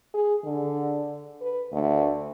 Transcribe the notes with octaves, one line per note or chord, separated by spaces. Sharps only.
G#4
D3
B4
D2